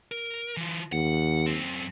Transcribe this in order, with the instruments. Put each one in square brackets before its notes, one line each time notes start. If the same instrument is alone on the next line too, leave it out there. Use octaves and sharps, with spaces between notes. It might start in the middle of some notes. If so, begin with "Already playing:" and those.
[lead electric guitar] A#4
E3 F4
[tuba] D#2 [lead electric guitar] F#5
[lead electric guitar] F#2 C4